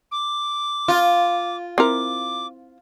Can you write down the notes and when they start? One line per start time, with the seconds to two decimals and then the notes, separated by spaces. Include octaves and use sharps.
0.12 D6
0.88 F4
1.78 C4 E4 A#4 D6